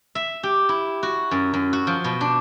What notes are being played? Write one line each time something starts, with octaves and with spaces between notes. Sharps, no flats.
E5
G4
E4
F#4
F#2
F#2
F#4
F3
B2
D4